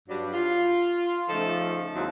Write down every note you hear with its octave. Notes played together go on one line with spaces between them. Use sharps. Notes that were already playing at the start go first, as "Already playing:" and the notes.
G2 F#3 G3 D4
F4
C#3 F3 A3 D#4 A4
D#2 F#3 G#3 C4 E4